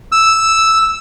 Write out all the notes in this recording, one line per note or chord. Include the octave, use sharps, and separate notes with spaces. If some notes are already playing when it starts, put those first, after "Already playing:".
E6